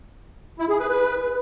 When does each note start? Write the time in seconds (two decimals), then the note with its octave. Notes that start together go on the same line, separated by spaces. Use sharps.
0.59 E4
0.69 G#4
0.79 B4
0.89 B4